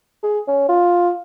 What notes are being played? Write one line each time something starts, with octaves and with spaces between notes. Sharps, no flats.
G#4
C#4
F4